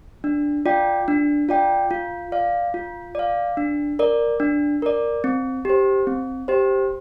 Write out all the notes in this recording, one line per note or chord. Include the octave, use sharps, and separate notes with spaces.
D4
F4 D5 G5
D4
F4 D5 G5
F4
D5 F5
F4
D5 F5
D4
A#4 D5
D4
A#4 D5
C4
G4 C5
C4
G4 C5